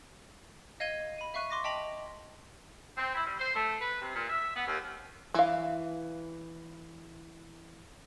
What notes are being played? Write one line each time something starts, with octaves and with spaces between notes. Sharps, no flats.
D#5 F5 G#6 D#7 G7
B5 D#7
E5 F5 C#6 F#6 D#7
C6 D6 A#6
D#5 G5 A5 B6 F7 F#7
C4
E4
G3
C5
A3
B4
C3
A#2
E5
B3
D#2
E3 F5